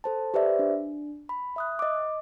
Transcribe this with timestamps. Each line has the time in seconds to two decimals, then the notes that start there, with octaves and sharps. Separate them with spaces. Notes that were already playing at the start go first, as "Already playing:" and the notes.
0.04 A4 C5 A5
0.34 G4 B4 C5 D5 E5
0.59 D4
1.29 B5
1.56 E5 D#6 F#6
1.79 D#5 D6